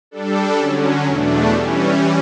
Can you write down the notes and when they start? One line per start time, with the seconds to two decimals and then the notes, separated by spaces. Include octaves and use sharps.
0.11 G3 D4 A4
0.58 D3 F#3 C#4
1.05 E2 B2 A3 D4
1.53 E3 G3 C#4